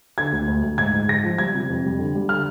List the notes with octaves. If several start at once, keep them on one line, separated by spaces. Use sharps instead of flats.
D3 G#6
D2
D2
D2
G#2 G#6
G#2
G#2 A#6
F3
G3 G#6
C3
F2
G3
D3
G3
D3 F6